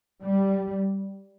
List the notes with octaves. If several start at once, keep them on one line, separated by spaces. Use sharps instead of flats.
G3